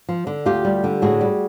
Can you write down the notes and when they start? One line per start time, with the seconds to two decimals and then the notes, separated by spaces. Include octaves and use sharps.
0.09 F3
0.27 D3
0.45 D2 F4 G4
0.65 G3
0.84 D3
1.02 A2 F#4 G#4
1.21 G3